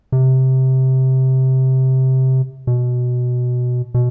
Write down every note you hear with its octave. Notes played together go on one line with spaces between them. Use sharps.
C3
B2
B2